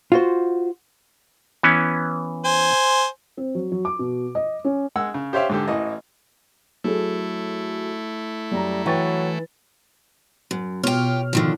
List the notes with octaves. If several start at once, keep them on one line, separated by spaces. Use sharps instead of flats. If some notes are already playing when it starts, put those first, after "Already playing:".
F4 F#4 C5
E3 B3 C#4
C5 G#5
C4
F#3
F#3
D6
B2
D#5
C#4
G#3 F#5 E6
C#3
G4 C5 C#5 E5 F5 G5
G#2 D3 G4
A1 E3 D#5
F#3 A3 E4 G#4 A4
F#2 G3 A#5
E3 F#3 G5 C#6 A6
F#2
B2 F4 G4 C#5 F6
D3 D#3 F3